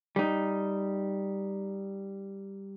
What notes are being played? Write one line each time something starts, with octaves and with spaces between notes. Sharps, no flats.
G3 D#4